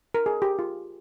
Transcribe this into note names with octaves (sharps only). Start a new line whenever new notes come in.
A#4
G#4
G4
F4